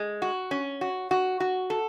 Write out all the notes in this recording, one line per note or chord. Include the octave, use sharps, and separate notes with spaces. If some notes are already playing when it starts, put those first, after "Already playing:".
Already playing: G#3
F#4
C#4
F#4
F#4
F#4
A4